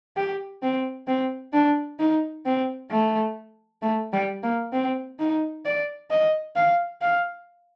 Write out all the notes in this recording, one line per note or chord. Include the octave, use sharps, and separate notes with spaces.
G4
C4
C4
D4
D#4
C4
A3
A3
G3
A#3
C4
D#4
D5
D#5
F5
F5